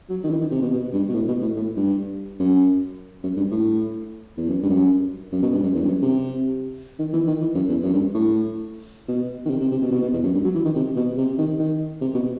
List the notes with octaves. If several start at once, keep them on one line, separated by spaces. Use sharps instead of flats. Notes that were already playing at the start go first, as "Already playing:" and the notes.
F#3
D#3
E3
D#3
C3
B2
B2
G2
B2
A2
B2
A2
A2
G2
F#2
F#2
G2
A2
E2
F#2
G2
F#2
F#2
B2
G2
F#2
E2
G2
F#2
C3
D#3
E3
D#3
E3
F#2
E2
F#2
G2
A2
B2
D#3
C3
C3
C3
B2
B2
B2
E2
F#2
G2
F#3
E3
D#3
C3
B2
C3
D#3
D#3
C3
B2